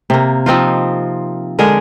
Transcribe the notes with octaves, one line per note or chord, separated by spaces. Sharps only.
C3 A#3
F3 C4 D#4 F4
D3 G#3 G#4 A#4